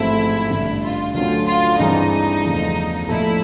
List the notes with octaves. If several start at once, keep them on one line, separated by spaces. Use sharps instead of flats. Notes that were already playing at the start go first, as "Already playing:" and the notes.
Already playing: A1 G#2 F3 A3 C4 E4
A1 G2 D3 E4
F4
D2 D3 F#3 A3 C#4 F4
F4
G2 E3 G#3 C4 D#4
E2 C#3 F3 A3
A#1 A2 F3 A3 E4